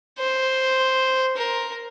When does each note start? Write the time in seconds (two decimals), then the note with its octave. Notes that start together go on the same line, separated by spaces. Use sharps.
0.19 C5
1.37 A#4